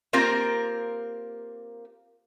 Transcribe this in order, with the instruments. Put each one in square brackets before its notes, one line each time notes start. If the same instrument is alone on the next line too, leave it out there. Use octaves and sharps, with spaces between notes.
[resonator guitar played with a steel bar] A#3 C4 F4 G4 A#4